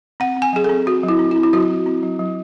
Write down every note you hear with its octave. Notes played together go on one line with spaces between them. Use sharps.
C4 F#5
C4
G#5
F#3 G#4
A4
C4
C4 F#4
F#3
E4
C4
E4
C4
E4
F#3 F#4
C4
C4
F#3
F#3